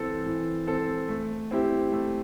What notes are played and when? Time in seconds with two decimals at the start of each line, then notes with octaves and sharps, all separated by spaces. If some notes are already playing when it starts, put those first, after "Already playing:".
Already playing: E3 C4 A4
0.26 E3
0.67 C4 A4
1.08 A3
1.51 C4 E4 G4
1.92 A3